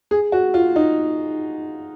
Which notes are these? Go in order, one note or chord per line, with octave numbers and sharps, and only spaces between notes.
G#4
F#4
F4
D#4